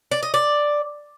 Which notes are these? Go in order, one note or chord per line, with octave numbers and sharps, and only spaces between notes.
D5
D#5
D5